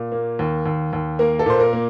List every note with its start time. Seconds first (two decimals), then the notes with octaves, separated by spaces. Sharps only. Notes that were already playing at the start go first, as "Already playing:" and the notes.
Already playing: A#2
0.12 A#3
0.39 D#2
0.66 D#2
0.93 D#2
1.19 A#3 A#4
1.39 A4
1.46 A#2 C5
1.60 A#4
1.73 A#3